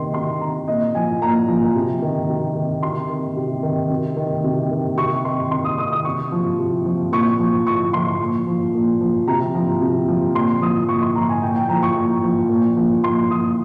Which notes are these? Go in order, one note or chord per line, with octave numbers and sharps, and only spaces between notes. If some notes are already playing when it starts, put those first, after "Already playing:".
Already playing: C3 D#3 C6
C3 C6
D#3 A#5
A#2 D#5
F3 G#5
A#2 A#5
F3
C3
D#3
C3
D#3
C3 C6
D#3
C3
D#3
C3
D#3
C3
D#3
C3 C#6
D#3 C6
C3 C6
D#6
D#3 D#6
D#6
C3 C#6
F3
C3
F3
A#2 C#6
F3
A#2 C#6
F3 C6
A#2
F3
A#2
F3
C3 A#5
F3
C3
F3
A#2 C6
F3 D#6
A#2 C#6
C6
F3 A#5
G#5
A#2 G5
G5
F3 A#5
C#6
A#2
F3
A#2
F3
A#2 C6
F3 D#6